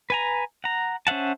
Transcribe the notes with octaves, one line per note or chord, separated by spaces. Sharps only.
B4 G#5 A#5
F#5 A#5
C#4 C5 E5 F#5 A5